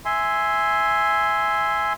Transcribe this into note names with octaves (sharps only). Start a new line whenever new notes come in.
E5 G#5 C6